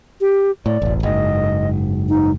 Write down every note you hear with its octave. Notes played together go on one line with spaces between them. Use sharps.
G4
A2 D5
E1 A1
F#1 G#2 D#5
D#4